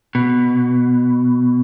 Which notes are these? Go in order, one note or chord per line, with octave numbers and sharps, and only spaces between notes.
B2